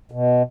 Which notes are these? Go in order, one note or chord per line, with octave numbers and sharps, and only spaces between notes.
B2